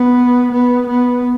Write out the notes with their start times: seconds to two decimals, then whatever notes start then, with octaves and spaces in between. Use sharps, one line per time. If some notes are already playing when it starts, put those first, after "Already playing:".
Already playing: B3
0.51 B3
0.87 B3